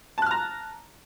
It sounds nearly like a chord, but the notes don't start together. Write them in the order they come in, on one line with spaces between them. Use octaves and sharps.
A5 F#6 F6 A#5